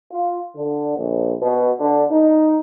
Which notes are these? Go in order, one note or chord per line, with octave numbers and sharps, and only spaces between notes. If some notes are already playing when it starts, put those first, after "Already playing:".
F4
D3
A#1
B2
D3
D#4